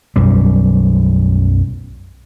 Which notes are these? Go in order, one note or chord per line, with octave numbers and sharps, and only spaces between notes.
B1 F#2 G3